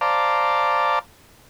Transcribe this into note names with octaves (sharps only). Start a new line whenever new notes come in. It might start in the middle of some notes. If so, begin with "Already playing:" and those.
C5 D5 F5 A5 A#5 D6